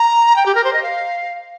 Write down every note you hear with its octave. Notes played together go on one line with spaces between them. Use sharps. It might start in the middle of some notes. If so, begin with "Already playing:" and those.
Already playing: A#5
G5
G4
A#4
C5
D#5
F5